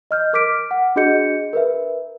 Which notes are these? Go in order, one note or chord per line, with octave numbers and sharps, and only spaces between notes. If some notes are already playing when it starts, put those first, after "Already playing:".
D#5 F6 G6
A#4 D6 F6 B6 D7
F#5
D4 F#4 G#4 D#5 G6 C#7
A#4 B4 E5